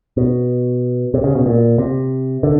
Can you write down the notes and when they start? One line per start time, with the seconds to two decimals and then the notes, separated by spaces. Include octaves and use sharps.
0.17 B2
1.14 C3
1.24 C#3
1.35 B2
1.46 A#2
1.78 C3
2.43 D3